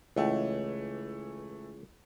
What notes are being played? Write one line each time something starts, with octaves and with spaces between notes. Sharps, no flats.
C#2 E3 A3